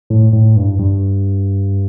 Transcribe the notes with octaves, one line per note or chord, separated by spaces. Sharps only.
A2
A2
G2
G2